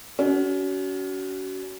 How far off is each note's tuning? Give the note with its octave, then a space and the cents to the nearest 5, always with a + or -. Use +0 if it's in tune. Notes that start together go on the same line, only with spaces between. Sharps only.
C#4 +35 F#4 +25